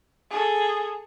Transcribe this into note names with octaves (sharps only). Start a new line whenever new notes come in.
G#4 A4